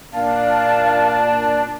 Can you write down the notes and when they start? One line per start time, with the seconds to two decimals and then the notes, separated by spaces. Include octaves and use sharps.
0.13 A#2 A#3 D4 F5 A5